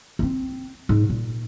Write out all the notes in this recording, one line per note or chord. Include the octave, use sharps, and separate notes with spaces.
C4 C#4
G#2
A#2